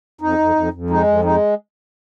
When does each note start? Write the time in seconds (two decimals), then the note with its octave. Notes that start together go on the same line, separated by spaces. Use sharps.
0.21 F2 D#4
0.39 F2
0.55 F2
0.73 F2
0.90 G#3 D#4
1.07 F2
1.24 G#3 D#4